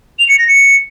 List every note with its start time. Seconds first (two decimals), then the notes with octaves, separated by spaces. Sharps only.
0.19 F7
0.29 C#7
0.38 A#6
0.48 C#7